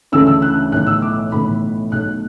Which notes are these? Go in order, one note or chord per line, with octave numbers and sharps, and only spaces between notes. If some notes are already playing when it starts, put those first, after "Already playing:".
D2 C#3 E3 A3 D4 E6
E6
F#6
B1 A2 E3 F#6
E6
D6
B1 A2 E3 B5
B1 B2 A3 F#6